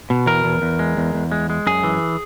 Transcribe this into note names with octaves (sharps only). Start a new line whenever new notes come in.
B2
E2 A#4
E2
E2
G#3
E2
E2
G#3
G#3
F#2 G#4
E3